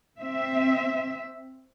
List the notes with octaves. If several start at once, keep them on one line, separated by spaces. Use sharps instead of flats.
C4 E5